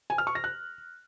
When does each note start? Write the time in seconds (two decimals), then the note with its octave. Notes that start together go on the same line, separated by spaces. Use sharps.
0.10 G#5
0.18 F6
0.27 C#6
0.35 A#6
0.44 F#6